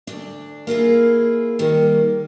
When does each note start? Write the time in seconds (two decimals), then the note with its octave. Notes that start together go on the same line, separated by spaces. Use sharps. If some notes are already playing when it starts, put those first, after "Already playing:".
0.07 D2 D4
0.67 A#3 E4 F4 G#4
1.59 D#3 G3 A#3